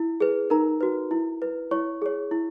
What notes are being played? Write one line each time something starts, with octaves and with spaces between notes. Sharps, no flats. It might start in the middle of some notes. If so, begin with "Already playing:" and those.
Already playing: E4
G#4 B4
D#4 A#4 A#5
F#4 B4
E4
B4
E4 C#5 C#6
G#4 C#5
E4